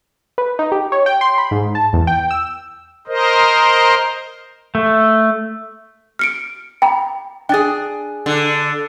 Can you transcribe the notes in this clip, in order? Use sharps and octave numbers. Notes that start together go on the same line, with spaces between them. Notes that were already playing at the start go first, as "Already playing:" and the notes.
B4
D#4
G4
C#5
G5
C6
B5
G#2
A5
E2
G5
E6
A#4 C5 D#5
A3
F6 C#7 D7
G5 A#5 B5
D4 G#4 G5 A6
D3